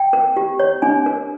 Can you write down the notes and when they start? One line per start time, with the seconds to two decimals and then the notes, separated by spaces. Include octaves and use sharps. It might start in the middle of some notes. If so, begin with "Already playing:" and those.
Already playing: G5
0.13 A#4
0.37 G4
0.59 C#5
0.82 D4 G#5
1.06 A#4